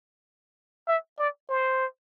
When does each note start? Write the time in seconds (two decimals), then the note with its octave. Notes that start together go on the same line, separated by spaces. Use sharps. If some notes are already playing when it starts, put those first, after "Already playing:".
0.88 E5
1.19 D5
1.49 C5